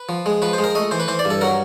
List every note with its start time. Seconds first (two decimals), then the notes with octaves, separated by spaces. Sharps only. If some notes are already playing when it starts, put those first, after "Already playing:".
Already playing: B4
0.09 F3
0.26 G#3
0.42 F3 B4
0.53 C5
0.58 G#3
0.64 A#4
0.75 A3 D#5
0.91 E3 C5
1.00 B4
1.08 E3 C5
1.19 D5
1.25 G2
1.30 A4
1.41 F#3 A#4